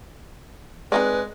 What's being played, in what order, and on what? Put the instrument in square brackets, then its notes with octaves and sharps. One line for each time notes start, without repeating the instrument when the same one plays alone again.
[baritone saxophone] G#3 [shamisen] C4 D#4 D5 [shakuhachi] B4